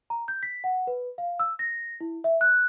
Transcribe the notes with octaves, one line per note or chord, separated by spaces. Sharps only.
A#5
G6
B6
F#5
B4
F5
E6
A#6
E4
E5
F#6